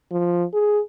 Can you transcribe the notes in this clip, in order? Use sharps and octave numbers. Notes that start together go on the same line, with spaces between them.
F3
G#4